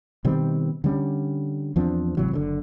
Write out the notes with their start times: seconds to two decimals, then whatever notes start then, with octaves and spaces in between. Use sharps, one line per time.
0.25 B2 D#3 G3 C4
0.84 D3 G3 C#4
1.76 E2 F3 C4 D4
2.17 G#1 C3 E3 F#3
2.31 F#1 A#2 D3